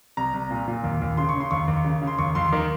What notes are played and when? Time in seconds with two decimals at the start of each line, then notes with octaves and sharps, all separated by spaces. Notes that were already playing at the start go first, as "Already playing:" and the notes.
0.17 C2 A#5
0.34 C2
0.51 A#2
0.68 A#2
0.84 D#2
1.02 D#2
1.17 C#3 C6
1.29 C#6
1.35 C#3
1.40 C6
1.51 D#2 C#6
1.68 D#2
1.84 C#3
2.02 C#3
2.07 C6
2.18 D#2 C#6
2.35 D#2 C6
2.53 D#3